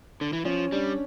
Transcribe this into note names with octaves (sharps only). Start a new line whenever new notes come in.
D3
E3
F3 C#4
G3 D4